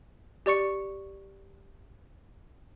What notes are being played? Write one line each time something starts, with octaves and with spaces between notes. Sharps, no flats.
G4 D5 C#6 C#7